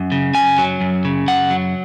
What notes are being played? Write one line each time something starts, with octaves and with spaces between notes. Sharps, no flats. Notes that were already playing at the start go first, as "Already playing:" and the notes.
Already playing: F#2
C#3
F#2 G#5
F#3
F#2
C#3
F#2 F#5
F#3